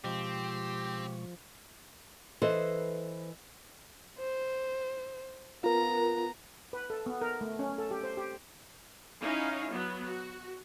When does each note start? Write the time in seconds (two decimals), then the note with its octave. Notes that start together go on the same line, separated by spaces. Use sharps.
0.04 B2 F3 G#3 C4 G4 C#6
2.42 E3 A4 B4 C5 D#5 E5
4.19 C5
5.64 B3 F4 A#4 A#5
6.73 B4
6.90 A4
7.06 B3
7.22 A#4
7.41 A3
7.59 C#4
7.78 A4
7.91 G4
8.03 C5
8.17 G4
9.21 C#4 D#4 E4 C#5 F5
9.70 F#3 B3
10.05 F#4